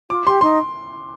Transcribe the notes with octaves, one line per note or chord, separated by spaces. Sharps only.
F4 D6
G4 C6
D#4 C6